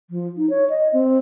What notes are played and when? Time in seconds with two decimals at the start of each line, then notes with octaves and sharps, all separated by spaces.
0.10 F3
0.37 D#4
0.50 C#5
0.70 D#5
0.93 C4